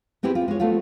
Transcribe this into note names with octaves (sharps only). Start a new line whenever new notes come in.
B3 C4 E4 G4 G#4 B4
F4
G#3 C#5
A3 B3 C4 F4